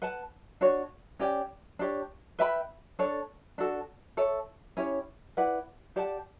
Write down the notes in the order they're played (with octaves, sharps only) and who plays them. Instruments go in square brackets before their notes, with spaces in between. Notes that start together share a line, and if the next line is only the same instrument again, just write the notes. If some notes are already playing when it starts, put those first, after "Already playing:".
[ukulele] B4 F#5 A5
D4 F#4 C#5
C#4 G4 D5 G5
D4 G4 C#5
B4 E5 G5 B5
D4 A4 C#5
D4 F#4 A4
A4 C#5 E5
C#4 E4 G4 C#5
E4 B4 D5 F#5
G4 D5 F#5 A5